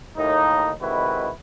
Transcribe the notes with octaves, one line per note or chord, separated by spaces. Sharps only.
D#2 A2 D#4
C3 D#3 G#3 E4 F#4 B4